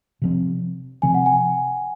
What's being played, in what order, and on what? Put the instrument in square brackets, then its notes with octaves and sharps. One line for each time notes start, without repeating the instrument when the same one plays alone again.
[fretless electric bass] C3 F3 C4
[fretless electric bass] C3 F3 C4 [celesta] G#5
[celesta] F#5
G#5